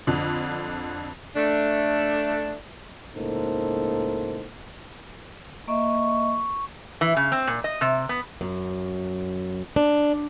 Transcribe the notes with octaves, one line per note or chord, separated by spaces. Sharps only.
F2 D3
A3 D4
C#2 A2 A#3 D#4 A4 C5
A#3 D#5 E5 C#6
E3
C#3
C4
A#2
D#5
C3
B3
F#2
D4